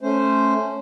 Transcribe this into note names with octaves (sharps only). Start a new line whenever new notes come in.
A3 C#4 C5